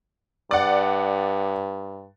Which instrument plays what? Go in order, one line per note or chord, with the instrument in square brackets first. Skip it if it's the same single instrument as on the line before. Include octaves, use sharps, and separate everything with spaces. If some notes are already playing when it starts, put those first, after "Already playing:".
[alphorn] G2 [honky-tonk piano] D5 F#5